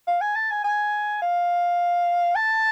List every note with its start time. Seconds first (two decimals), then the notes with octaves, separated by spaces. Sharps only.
0.08 F5
0.21 G#5
0.36 A5
0.51 G#5
0.64 G#5
1.22 F5
2.36 A5